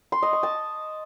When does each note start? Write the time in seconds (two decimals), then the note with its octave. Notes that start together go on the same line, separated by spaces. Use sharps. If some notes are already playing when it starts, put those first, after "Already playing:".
0.12 C6
0.23 D#5
0.33 C#6
0.43 A5